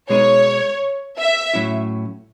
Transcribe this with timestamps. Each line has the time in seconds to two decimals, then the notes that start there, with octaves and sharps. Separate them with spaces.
0.10 B2 G#3 D#4 C#5
1.18 E5
1.54 A2 F#3 C#4 E4